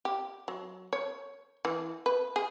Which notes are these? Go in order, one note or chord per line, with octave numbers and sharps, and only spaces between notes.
G4
F#3
C#5
E3
B4
G#4